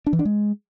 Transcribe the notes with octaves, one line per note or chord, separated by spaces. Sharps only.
D4
E3
D4
G#3